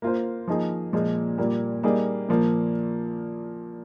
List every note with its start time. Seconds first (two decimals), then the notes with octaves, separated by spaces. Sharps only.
0.02 A#3 F4 C5
0.47 F3 A#3 D#4 G#4
0.93 A#2 F3 G#3
1.38 A#2 G3 A#3
1.83 G3 A#3 D#4 G#4
2.28 A#2 F3 A#3